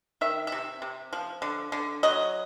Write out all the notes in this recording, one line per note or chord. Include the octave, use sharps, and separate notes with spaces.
D#3 E5
C3 E5
C3
F3
D3
D3
F#3 D#5